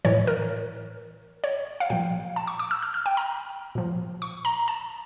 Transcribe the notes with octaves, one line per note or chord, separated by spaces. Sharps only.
A2 E3 C#5
A#4
C#5
F5
A#2 F3 G5
A5
C#6
D6
E6
F6
F6
G5
A#5
A#2 F3
C#6
A#5
A5